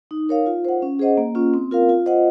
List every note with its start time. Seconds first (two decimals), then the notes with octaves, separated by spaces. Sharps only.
0.11 D#4
0.29 A#4 C#5 F5
0.46 F4
0.65 C5 F#5
0.82 C#4
0.99 G#4 C5 D#5 F#5
1.17 A#3
1.35 C#4 F4
1.54 C4
1.71 F4 A#4 F5
1.89 F4
2.06 C5 D#5 F#5